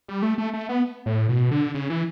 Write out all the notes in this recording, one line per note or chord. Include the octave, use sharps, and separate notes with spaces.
G3
A3
A3
A3
B3
A2
B2
D3
C#3
E3